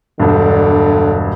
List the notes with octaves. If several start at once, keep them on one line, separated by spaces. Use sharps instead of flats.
E1 G2 D3